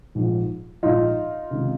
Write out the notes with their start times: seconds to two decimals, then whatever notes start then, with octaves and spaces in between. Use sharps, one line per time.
0.15 A#1 G#2 F3
0.83 A#1 G#2 F3 D#4 F4
1.51 C#2 C3 D#3